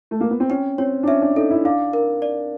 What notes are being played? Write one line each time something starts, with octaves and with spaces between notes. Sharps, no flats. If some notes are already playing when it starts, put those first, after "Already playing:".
A3
A#3
B3
C4
C#4 G5
C4 C#5
D4
C#4 E5
D4
D#4 A4
E4
D4 F5
A#4
D5